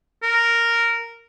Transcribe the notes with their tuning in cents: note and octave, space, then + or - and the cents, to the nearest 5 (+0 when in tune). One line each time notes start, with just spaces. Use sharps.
A#4 -5